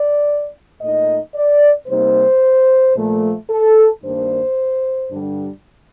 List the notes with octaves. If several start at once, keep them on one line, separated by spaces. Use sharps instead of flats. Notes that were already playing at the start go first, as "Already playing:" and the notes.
Already playing: D5
A#2 A3 D#4 D#5
D5
C3 G3 A#3 D#4 C5
A#2 F3 A3
A4
G2 D#3 A#3 D4 C5
G2 D3 G3 D4